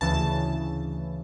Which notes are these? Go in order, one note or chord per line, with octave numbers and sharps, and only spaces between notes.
D2 C#3 E3 A5